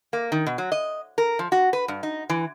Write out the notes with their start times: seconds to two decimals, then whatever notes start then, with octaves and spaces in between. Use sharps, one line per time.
0.13 A#3
0.32 D#3
0.47 B2
0.58 F#3
0.72 D#5
1.18 A#4
1.39 F3
1.52 F#4
1.73 B4
1.88 G2
2.03 D#4
2.30 E3